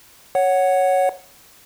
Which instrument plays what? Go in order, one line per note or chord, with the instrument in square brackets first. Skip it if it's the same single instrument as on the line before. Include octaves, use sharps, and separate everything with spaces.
[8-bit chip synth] C#5 F#5